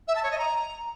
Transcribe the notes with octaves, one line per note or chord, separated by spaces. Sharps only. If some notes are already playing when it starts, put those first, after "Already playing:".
E5
A5
C#5
D#5
A#5